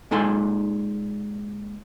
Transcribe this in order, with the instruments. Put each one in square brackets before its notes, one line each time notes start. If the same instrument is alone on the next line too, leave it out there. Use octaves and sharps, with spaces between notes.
[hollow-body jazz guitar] A#2 G#3 D#4 A4 G#5 C6